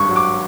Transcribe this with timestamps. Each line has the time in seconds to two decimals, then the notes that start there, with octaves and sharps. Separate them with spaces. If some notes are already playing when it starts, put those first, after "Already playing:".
Already playing: G#1 G2 C#6
0.09 F#3
0.16 D6